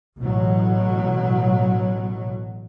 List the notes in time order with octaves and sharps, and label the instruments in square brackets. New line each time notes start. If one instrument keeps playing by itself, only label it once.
[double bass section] A1 B2 F#3